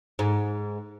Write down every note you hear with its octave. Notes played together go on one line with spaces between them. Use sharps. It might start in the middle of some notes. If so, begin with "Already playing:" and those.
G#2